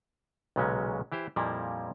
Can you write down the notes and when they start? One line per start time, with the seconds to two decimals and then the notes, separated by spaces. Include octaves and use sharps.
0.56 B1 A#2 C#3 F#3 G#3 C#4
1.12 E3 E4 G4 C5
1.36 F2 A#2 F3 G3 A#3 E4